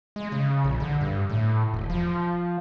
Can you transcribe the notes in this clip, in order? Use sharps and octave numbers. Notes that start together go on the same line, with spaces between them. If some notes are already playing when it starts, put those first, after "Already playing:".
G#3
C#3
A#1
D3
G2
A2
E1
F3